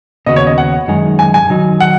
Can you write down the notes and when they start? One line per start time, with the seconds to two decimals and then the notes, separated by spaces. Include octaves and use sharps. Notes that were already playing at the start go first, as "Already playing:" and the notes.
0.26 D#2 C#3 B3 F#4 D#5
0.36 C#5
0.47 D#5
0.58 F#5
0.88 F#2 D#3 G#3 D#4 G#4
1.19 G#5
1.34 G#5
1.50 D#3 F#3 D#4
1.80 F#5